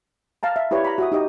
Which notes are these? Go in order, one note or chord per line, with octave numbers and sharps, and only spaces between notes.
F5 A5 A#5
E5
E4 G4 B4 C#5 D5
A#5 B5
F#4 E5 D#6
D#4 G4 D#5